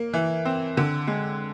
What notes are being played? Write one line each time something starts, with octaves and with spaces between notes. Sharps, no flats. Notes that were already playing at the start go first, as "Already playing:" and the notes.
Already playing: A#3
E3
C4
D3
G#3